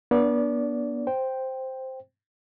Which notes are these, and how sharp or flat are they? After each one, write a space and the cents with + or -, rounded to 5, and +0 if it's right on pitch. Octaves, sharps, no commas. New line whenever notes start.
B3 -40 D4 -5 D5 -30
C5 +0 G5 +0